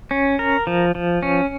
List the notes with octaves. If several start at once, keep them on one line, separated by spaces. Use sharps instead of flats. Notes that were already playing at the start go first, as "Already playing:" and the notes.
C#4
A#4
F3
F3
C#4